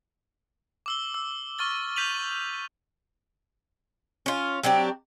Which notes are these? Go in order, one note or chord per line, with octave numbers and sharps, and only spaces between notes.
D6 E6 G7
E6
C#6 F6 A6 G7
G6 B6 D#7 F7 F#7
C#4 F4
F#3 C4 D4 G4